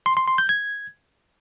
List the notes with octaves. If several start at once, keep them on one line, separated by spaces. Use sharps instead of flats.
C6
C6
C6
G6
G#6